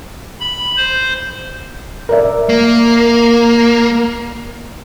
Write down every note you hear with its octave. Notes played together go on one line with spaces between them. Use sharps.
B5
C5
A#4 D5 E5
A#3